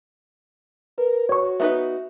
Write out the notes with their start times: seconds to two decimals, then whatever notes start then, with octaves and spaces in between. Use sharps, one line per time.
0.98 A#4 B4
1.29 F#4 C#5 C#6
1.60 B3 D#4 B4 E5